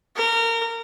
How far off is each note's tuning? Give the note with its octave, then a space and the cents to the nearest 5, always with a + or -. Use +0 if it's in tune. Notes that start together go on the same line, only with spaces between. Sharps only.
A#4 -25